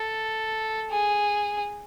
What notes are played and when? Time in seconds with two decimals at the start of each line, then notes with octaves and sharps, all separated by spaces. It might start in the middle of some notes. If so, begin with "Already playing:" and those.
Already playing: A4
0.91 G#4